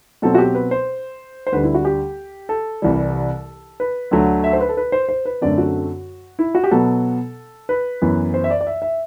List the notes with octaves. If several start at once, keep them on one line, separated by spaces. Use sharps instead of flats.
B2 F#3 C4 A4
F#4
G4
B4
C5
C5
D2 D3 G3 B4
E4
F#4
G4
A4
C2 C3 E3 G3
B4
D2 D3 F#3 A3
E5
C5
B4
A4
B4
C5
C5
B4
F#2 D3 A3 C4 D5
F#4
E4
F#4
G4
B2 F#3 B3 A4
B4
F#2 E3 B3
C5
E5
D5
D5
E5
E5